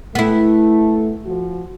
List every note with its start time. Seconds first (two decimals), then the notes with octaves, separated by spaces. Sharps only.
0.15 A3 B3 E4
1.26 F3 F#4